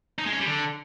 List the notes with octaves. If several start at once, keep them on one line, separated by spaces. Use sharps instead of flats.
D#4
G#3
C#4
G3
D3